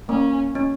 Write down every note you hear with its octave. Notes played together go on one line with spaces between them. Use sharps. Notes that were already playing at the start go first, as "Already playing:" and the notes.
A#3 C#4
C#4